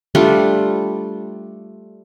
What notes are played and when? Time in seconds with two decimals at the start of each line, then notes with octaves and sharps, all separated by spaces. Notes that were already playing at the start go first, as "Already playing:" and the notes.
0.15 G3 A3 D4 F4